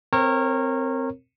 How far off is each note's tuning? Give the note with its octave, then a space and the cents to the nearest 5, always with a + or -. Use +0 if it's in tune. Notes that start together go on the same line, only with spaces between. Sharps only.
C4 +0 A#4 -15 C#5 -30